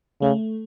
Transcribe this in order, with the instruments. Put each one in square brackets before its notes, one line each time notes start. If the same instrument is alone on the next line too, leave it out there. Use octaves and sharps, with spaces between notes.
[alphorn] C#3 [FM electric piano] A3